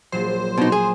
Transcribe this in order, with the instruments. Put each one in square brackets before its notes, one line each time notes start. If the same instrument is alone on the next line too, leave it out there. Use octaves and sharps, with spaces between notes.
[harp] A#1 A#2 F#3 [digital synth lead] C5
[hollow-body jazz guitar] B2 D#4
G#4